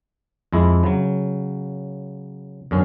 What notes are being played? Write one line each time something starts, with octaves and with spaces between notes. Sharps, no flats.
F2 G#3 E4
C#3 F#3
F#2 D3 C#4